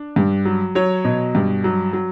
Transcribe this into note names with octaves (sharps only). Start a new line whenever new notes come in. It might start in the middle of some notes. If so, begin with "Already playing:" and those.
Already playing: D4
G2
F#3
F#3 C#5
B2
G2
F#3
F#3